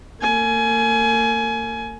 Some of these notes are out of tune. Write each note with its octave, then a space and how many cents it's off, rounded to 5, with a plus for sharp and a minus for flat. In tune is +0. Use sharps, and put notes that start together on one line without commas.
A#3 -40 G#5 +25